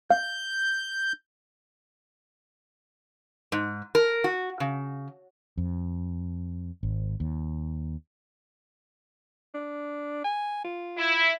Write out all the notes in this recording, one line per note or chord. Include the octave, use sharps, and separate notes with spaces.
F5 G6
G#2
A#4
F#4
C#3
F2
G#1
D#2
D4
G#5
F4
E4